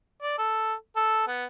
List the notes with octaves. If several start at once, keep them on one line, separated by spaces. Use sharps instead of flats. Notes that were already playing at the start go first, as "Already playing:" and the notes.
D5
A4
A4
B3